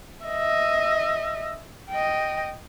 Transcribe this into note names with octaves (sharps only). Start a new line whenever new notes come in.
D#5 E5
D#5 G5